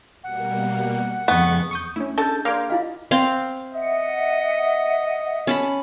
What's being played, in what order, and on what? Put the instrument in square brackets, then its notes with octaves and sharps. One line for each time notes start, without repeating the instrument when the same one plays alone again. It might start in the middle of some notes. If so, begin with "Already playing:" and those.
[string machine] B2 G3 A#3 [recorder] F#5
[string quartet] F2 C#6 [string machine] C#3 G#3 [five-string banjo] B3
[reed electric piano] E2 [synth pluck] C#6 D#6 G6
[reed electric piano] A3 D4 [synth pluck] C#4 E4
[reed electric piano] D4 G#4 G6 [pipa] A4 A5
[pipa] A#3 [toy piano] C#5 D5 [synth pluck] C6 D6 F6
[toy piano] E4 F4 F5 [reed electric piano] D#5
[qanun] C4 F5 C6
[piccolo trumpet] D#5 [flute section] E5 F#5
[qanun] C#4 A5 B5